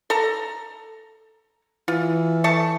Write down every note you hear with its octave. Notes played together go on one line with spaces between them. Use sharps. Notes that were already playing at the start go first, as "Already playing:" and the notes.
A4 A#5
E3 F4
A3 A5 C#6